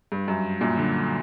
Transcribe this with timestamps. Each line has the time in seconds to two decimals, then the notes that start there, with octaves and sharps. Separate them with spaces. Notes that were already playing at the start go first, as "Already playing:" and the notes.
0.12 G2
0.28 F#2
0.61 F#2 A#2
0.77 D3 F#3